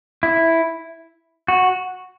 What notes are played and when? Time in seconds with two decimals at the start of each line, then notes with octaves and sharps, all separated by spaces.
0.23 E4
1.48 F#4